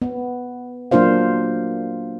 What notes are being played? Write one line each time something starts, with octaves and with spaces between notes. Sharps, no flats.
B3
F#3 A#3 D4 F4 C5 F5